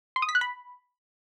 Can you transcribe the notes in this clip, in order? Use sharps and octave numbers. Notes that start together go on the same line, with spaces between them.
C6
D#6
B6
F#6
B5